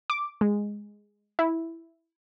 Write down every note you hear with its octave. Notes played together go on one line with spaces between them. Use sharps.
D6
G#3
E4